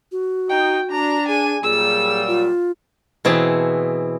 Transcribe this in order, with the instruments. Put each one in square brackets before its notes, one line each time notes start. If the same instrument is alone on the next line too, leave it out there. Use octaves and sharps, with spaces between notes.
[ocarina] F#4
[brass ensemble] D#4 [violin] G5
[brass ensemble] D4 [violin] A#5
[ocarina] G#4 [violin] G#5 D#7
[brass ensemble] A#2 F#3 G3 [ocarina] G#4 [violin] E6
[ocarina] F4
[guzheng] B2 E3 C4 G#4 A5